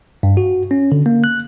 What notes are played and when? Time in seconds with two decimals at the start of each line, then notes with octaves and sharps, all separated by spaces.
0.23 G2
0.37 F#4
0.71 C#4
0.92 D3
1.06 A#3
1.24 F#6